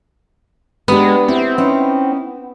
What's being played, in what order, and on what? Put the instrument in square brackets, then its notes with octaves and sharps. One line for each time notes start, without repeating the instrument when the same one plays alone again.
[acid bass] G#3 [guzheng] B3 [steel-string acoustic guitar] D4 G4 B4
[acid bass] C4 [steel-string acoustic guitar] E4 G4
[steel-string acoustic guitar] C#4 D#4 E4